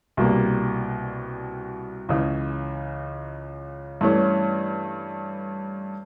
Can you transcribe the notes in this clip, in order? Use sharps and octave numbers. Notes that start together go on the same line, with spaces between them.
C2 B2 G3 A#3
C#2 C#3 E3
G2 E3 A3 C#4